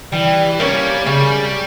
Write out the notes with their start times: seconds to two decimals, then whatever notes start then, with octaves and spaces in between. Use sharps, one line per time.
0.12 E3 G3
0.60 G3 A#3 C#4
1.06 C#3 G3